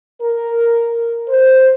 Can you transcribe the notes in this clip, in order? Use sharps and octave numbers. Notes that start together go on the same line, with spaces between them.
A#4
C5